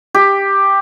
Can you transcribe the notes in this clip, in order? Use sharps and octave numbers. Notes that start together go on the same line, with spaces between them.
G4